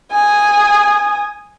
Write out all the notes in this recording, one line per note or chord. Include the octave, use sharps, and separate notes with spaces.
G#5 D#6